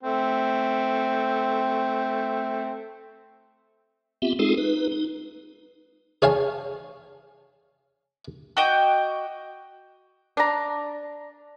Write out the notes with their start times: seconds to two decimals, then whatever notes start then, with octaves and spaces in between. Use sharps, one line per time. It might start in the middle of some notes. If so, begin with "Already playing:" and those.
0.03 A3 C4
4.22 B3 C4 F4 G4 E5
4.39 G#3 C4 D#4 F4 G#4 A4
4.58 D#4 B4
4.92 D#4
6.22 G#4 C#5 F5 G#5 A5
8.57 F#4 D#5 G5 D6
10.37 D4 A#5